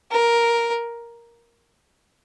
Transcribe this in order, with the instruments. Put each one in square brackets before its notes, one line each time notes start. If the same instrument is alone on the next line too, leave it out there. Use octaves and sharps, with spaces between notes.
[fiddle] A#4